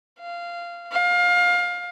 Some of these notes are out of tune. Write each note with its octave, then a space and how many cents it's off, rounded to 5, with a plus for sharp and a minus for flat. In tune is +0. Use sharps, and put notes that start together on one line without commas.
F5 -15
F5 +25